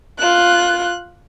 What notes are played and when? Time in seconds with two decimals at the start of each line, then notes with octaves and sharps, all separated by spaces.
0.18 F4 F#6